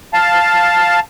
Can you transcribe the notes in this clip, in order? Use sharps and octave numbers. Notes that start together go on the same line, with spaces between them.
F5 A5